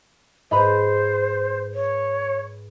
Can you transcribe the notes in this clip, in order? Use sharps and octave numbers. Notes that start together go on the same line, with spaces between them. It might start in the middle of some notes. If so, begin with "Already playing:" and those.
G#2 B4 C5 D#5 A#5 B5
C#5